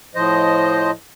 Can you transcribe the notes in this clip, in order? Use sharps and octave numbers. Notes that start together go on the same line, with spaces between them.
A2 F3 C5 D#5